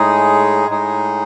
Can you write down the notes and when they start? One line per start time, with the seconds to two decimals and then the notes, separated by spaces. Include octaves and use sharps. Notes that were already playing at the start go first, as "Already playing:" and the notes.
Already playing: A2 G#3 D#4 G#4
0.69 A2 G#3 D#4 G#4